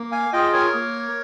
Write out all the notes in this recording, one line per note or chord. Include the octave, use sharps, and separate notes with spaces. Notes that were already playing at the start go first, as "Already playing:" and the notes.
Already playing: A#3
F5 G#5
F4 G#4 D#5 G5
A#4 C#5
A#3